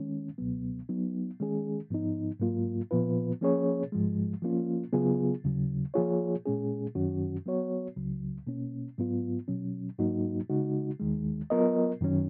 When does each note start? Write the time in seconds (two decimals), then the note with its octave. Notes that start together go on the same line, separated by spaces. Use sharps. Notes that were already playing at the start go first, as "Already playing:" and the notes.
Already playing: D#3 G#3 C#4
0.38 C#2 B2 F#3 B3
0.89 F#3 B3 D#4
1.40 D#3 G#3 C#4 G#4
1.90 G#2 F3 B3 D#4
2.40 G#2 F#3 A#3 F4
2.91 A#2 F3 B3 F4 B4
3.41 F3 A#3 C#4 G#4 C#5
3.92 G#2 F3 G#3
4.42 F3 A#3 C#4 F4
4.93 C#3 F#3 B3 F4 G#4
5.44 D#2 C#3 F#3
5.94 F3 A#3 F4 G#4 C#5
6.46 A#2 G#3 C#4 G#4
6.95 F#2 D#3 F#3 C#4 F#4
7.46 F#3 B3 F#4 C#5
7.96 C#2 C#3 F#3
8.47 B2 A#3 C#4
8.98 G#2 F#3 B3 F4
9.48 B2 F#3 C#4
9.99 G#2 F#3 A#3 D#4 F#4
10.50 C#3 G#3 D#4 F#4
11.00 D#2 D#3 G#3
11.50 F#3 B3 F4 A#4 D#5
12.01 F#2 D#3 F#3 C#4